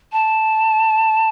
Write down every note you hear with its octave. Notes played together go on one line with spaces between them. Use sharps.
A5